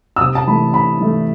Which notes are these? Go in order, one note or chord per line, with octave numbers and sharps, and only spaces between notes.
E6
C3 D#6
A5
E3 A3 B5
C3 B5
E3 A3